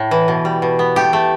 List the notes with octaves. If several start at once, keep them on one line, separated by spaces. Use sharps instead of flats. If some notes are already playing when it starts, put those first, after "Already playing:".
Already playing: A2
E3
B2
G3
B2
B3
A3 G4
A3